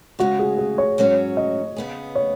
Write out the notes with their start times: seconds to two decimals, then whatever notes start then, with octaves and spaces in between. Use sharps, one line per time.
0.19 C#3 G#3 D#4 F#4
0.39 G#4
0.59 G#4
0.78 C#5
0.98 G#2 F#3 C#4 F#4
1.37 D#5
1.76 C#3 B3 G#4
2.15 C#5